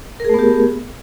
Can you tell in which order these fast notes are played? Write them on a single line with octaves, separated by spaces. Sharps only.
A#4 G#4 A3 B3 G4